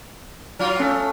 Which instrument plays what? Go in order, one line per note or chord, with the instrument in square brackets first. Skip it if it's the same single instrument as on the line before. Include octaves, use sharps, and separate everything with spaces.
[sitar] F#3 F4
[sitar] A3 [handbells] C#4